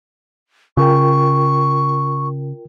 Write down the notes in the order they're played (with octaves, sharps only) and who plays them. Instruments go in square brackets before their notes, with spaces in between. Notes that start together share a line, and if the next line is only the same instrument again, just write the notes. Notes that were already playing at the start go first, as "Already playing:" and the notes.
[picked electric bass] C#3 [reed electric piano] F4 A#4 G5 [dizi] C#6